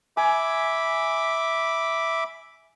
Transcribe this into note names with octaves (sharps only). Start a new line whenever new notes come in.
E5 G#5 B5 D6